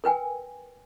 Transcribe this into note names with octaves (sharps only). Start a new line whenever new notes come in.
A#4 B4 G5 G#5